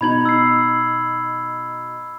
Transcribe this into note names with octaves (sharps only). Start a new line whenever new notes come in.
B2 D#4 B5 G#6 F#7
E6 C7